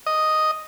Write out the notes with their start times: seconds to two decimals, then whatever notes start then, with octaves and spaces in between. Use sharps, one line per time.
0.06 D#5